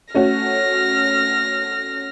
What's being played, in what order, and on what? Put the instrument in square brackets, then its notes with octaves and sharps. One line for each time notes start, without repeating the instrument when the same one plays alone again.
[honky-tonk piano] A3 C#4 F#4 [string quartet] F6 A#6